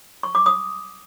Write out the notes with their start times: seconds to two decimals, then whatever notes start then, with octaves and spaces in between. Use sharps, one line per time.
0.23 C#6
0.35 D6
0.46 D#6